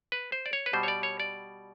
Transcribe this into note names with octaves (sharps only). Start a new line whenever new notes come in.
B4
C5
D5
C#5
B4
B2 G3 C5
C#5
D5
C#5
D5